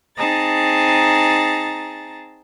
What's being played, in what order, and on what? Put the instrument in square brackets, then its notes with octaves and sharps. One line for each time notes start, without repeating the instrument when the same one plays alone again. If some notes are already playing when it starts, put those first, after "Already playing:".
[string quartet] C4 D#4 G#4 A5 A#5 A6